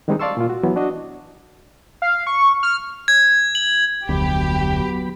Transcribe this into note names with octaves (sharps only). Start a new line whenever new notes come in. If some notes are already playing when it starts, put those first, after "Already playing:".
D#3 G3 G#3 C4 D4 D#4
D5 F5 A5 C6 C#6 E6
A#2 F4
F#4
E3 F#3 B3
D4 F#4 D#5
F5
C#6
F6
G#6
F#7
F1 D2 F#3 B3 G4 B5